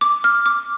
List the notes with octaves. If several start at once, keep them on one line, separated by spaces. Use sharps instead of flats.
D6
F6
D6